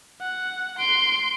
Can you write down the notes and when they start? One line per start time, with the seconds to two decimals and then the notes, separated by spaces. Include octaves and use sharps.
0.21 F#5
0.79 C6 D7